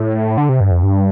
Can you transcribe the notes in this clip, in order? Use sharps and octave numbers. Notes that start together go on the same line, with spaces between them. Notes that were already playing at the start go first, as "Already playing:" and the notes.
Already playing: A2
D3
C3
G2
F2
G2